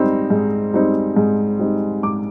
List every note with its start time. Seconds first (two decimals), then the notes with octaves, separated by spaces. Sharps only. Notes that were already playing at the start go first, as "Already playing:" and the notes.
Already playing: G#2 G3 C4 D#4
0.30 G#2
0.74 G3 C4 D#4
1.16 G#2
1.59 G3 C4 D#4
2.03 G#2 D6